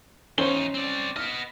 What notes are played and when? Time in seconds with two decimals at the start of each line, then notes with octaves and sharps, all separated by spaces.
0.38 E2 C#4 D#4 C5 G7
0.74 C4 D5
1.16 B3 D#5 F6